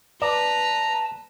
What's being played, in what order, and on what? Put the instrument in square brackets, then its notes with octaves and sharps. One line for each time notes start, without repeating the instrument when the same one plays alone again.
[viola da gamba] B4 [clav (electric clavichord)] D5 [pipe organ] A5 [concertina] A#5